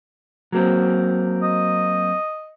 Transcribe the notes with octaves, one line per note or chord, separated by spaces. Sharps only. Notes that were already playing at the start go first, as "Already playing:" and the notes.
F#3 A#3 C4
D#5